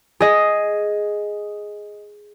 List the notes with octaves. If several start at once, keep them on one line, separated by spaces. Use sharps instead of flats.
G#4 D#5